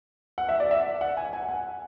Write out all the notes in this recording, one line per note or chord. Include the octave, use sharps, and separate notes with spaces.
F#5
E5
D5
E5
F#5
G#5
G#5
F#5